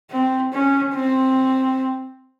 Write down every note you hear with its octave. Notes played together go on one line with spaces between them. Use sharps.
C4
C#4
C4